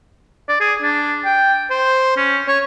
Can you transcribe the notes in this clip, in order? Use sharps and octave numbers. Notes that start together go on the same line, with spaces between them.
D5
G#4
D4
G5
C5
C#4
C#5